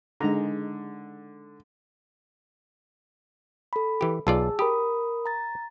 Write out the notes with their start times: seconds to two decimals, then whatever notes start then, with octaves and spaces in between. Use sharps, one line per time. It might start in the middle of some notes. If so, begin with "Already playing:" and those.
0.21 D3 G#3 D#4 A#5
3.73 A4 B5
4.01 E3 G4
4.27 B1 F4 G#4 D5 A5 E6
4.59 G4 A#4 B5 D#6
5.26 A#5 A6